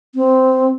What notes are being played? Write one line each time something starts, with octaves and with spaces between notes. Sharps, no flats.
C4